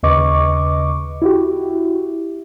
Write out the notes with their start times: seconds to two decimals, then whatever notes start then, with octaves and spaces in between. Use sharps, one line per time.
0.03 D#2 C#3 B4 D#5 C#6 D6
1.22 E4 F#4 G4